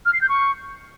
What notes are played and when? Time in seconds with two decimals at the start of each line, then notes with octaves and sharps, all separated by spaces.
0.06 F6
0.13 C7
0.21 G6
0.29 C#6